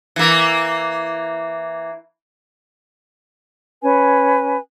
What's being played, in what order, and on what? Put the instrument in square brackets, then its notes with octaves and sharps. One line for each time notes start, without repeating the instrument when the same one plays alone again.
[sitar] E3 A#3
[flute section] C#4 B4 G#5